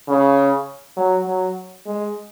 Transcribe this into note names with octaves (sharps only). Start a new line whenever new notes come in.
C#3
F#3
F#3
G#3